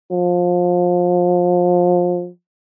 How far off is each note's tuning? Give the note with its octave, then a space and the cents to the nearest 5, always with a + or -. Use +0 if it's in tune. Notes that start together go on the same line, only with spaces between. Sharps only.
F3 +25